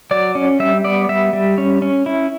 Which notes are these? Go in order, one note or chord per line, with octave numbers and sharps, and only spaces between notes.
F#3 D5
C#4
G3 E5
B3 D5
G3 E5
G3
C#4
C#4
E4